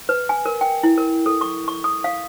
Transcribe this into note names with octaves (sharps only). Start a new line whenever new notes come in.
B4
G#5
A#4
G5
E4
A#4
A4
C#6
C#6
D#6
F5